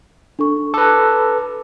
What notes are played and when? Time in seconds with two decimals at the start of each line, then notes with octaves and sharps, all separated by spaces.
0.39 D4 A4 C#6
0.74 A4 B4 D6